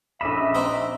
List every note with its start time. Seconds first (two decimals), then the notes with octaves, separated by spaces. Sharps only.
0.21 A#1 C#4 D#5 E5 B5 D6 E7
0.55 C4 D#4